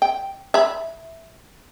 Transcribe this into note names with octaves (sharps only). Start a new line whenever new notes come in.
G5
E5 B5